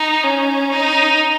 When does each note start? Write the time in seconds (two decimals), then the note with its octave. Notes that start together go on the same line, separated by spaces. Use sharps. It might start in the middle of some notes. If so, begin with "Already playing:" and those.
Already playing: D#4
0.24 C#4
0.72 D#4